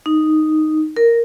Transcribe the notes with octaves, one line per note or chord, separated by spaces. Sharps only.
D#4
A#4